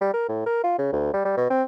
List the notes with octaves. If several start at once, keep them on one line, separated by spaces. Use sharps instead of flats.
G3
A#4
A2
A#4
F4
C#3
D2
G3
G3
B2
C4